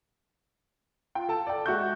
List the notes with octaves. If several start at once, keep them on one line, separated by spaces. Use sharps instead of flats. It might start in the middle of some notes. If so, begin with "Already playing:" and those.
F4 G5
A4 A5
D5 G5
G#3 F#4 E5 C#6 G6